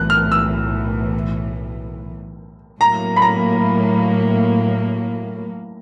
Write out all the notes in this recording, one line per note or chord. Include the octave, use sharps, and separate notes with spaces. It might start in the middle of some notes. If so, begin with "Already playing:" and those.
Already playing: B1 A2 E3 F#6
F6
E6
A2 F#3 A#3 A#5
B5
A#5